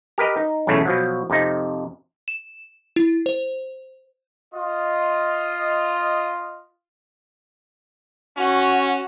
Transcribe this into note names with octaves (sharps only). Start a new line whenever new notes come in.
G4 A#4 B4 D#5
D#4
B1 E2 A2 C#3 A3
B2 F3 F#3
F2 C3 D#4
E7
E4
C5
F4 D#5
C#4 F#4